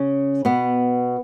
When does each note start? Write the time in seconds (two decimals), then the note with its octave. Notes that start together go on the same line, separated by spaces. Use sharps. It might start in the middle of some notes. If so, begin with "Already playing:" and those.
Already playing: C#3 C#4
0.45 B2 B3